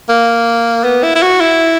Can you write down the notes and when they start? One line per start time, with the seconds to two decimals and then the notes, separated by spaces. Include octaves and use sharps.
0.09 A#3
0.84 B3
1.03 E4
1.15 E4
1.22 F#4
1.41 E4